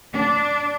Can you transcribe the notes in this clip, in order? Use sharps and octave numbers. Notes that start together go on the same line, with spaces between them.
D4